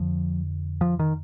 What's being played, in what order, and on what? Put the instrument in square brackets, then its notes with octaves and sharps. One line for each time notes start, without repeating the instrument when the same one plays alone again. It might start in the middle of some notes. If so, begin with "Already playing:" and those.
Already playing: [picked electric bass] F2 D3 F3
F3
D#3